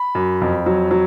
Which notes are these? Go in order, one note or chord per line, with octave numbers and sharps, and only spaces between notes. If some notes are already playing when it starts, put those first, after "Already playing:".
Already playing: B5
F#2
F2
F#3
F#3